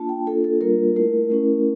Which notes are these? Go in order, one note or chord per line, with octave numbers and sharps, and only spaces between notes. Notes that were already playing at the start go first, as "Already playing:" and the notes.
Already playing: A#3 D4 F4 A5
G5
A#3 D4 F4 A4
A4
G3 A#3 D4 F4 A#4
A3 E4 A#4
A3 C#4 E4